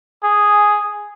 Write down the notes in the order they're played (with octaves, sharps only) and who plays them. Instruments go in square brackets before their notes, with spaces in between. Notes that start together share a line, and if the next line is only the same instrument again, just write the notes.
[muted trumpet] G#4